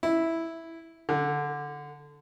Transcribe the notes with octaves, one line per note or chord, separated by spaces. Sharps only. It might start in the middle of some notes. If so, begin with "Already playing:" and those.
E4
D3